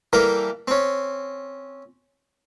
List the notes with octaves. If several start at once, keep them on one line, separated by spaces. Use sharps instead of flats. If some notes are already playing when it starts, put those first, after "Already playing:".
E3 G3 A#3 A4 A#4 G5
C4 C#4